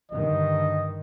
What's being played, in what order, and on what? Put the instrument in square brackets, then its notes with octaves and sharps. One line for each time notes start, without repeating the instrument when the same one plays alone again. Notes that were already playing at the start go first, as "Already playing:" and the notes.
[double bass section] G2 D3 D#3 [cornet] D#5